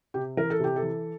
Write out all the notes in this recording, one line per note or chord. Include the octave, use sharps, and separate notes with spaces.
C3 G4
E3 A#4
A4
C3 G4
A4
E3